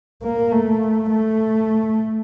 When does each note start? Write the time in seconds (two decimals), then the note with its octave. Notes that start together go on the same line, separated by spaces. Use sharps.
0.23 A#3
0.52 A3
1.10 A3